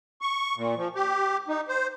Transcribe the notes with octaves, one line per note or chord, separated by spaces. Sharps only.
C#6
A#2
F3
G4
D#4
C5